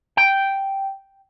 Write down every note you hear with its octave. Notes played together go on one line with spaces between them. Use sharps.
G5